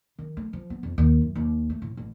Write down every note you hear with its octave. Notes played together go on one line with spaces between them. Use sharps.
D#3
A3
F3
B3
F2
D#2
F#2
D#2
A3
A2
A1